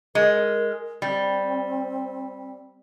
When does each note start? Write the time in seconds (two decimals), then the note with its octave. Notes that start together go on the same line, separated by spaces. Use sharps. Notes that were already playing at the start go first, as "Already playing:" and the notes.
0.15 G#3 A#4
1.02 G3 C4